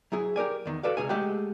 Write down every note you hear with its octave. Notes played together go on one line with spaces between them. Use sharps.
F#3 E4 G#4
G4 A#4 D5 G#5
E2 D#3
F#4 A4 B4 D5 F5
C#2 G#2 C3 G#4 C#5 G#5
G#3 A3 G4 F#5 G5